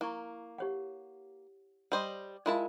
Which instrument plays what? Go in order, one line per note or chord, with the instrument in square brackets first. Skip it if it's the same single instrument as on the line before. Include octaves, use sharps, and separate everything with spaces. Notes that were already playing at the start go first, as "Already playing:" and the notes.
[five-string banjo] A#3 [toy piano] E4 C#6
[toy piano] G4 C#5 F#5
[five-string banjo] G3 C5 D#5
[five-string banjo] G#3 E4 A5 [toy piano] F4 A#4 F5